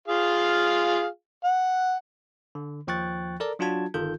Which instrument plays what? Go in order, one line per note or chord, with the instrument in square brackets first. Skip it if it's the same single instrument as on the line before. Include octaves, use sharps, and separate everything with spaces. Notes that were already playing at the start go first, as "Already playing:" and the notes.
[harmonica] F4 G#4 F5
F#5
[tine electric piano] D3
D#2 F3 G5 C#6 F#6 A6
A4 A#4 D5 A#5
F#3 D4 F4 F#4 A5 G#6
G1 D#3 F4 A4 G6